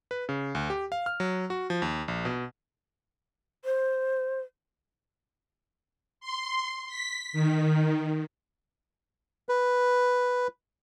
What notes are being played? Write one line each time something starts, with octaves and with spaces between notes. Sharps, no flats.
B4
C#3
D2
G4
F5
F6
F#3
F#4
F3
D#2
A#1
B2
C5
C6
B6
D#3
B4